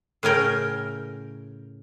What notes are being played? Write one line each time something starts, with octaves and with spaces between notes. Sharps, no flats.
A2 C#3 C#4 A#4 G5